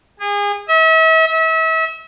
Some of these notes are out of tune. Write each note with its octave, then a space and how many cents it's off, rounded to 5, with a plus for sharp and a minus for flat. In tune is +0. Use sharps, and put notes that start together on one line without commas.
G#4 -30
E5 -40
E5 -35